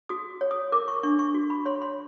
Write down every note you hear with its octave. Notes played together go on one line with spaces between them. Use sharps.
F#4 D#6
C#5
D#6
A#4 D6
C#6
D4 C#6
C#6
F#4
B5
C#5 C6
C6